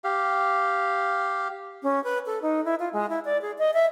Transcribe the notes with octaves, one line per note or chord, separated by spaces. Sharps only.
G4 F5
C#4
B4
A4
D#4
E4
F4
G#3
E4
D5
G#4
D#5
E5